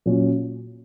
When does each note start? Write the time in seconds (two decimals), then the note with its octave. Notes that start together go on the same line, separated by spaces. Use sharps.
0.06 A#2 F#3 C#4